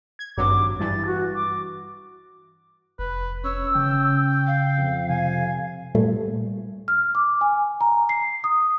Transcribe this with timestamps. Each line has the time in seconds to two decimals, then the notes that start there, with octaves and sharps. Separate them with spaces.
0.19 G#6
0.37 G#1 G2 F#3 D6
0.80 G2 E3 A6
1.05 F#4
1.34 D6
2.99 F1 B4
3.44 C#4 C#5 E6
3.75 C#3 G5
4.47 F5
4.78 F2
5.10 C3 G#5
5.95 A#2 G3 A3 A4
6.88 F6
7.15 D6
7.41 G#5
7.81 A#5
8.09 C7
8.44 D#6